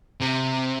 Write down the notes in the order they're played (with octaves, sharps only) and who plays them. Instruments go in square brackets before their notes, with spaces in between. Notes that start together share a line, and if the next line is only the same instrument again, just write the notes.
[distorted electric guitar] C3